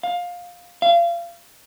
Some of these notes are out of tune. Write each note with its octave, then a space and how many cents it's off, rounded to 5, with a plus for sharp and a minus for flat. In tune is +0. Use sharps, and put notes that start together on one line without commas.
F5 +15
F5 -30